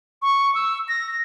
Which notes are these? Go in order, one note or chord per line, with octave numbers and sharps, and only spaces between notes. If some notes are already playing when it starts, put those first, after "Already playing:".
C#6
E6
A#6